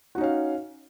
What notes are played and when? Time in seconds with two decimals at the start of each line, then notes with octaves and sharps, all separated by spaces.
0.15 F#4
0.18 D#4
0.21 C#4
0.24 F5